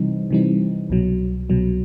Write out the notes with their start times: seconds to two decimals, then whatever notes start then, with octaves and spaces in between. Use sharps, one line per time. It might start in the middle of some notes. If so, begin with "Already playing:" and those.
Already playing: C3 E3 G3 C4 D#4
0.30 C3 E3 G3 C4 D#4
0.90 C2 B2 F#3
1.50 C2 B2 F#3